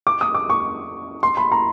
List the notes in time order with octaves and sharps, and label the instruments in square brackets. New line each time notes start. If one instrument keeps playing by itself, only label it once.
[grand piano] D6
D#6
D6
C#6
C6
B5
A#5